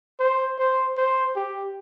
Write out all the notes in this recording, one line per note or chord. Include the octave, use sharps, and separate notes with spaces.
C5
C5
C5
G4